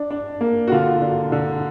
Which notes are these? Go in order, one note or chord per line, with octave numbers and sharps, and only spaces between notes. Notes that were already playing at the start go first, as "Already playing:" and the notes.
Already playing: D4
D4
A#3
F#4
D3 F4
D3
D3